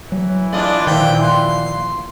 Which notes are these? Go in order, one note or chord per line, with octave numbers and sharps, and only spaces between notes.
E3 F#3
D4 F4 D5 D#5
A#2 D#3 F3 G5
C6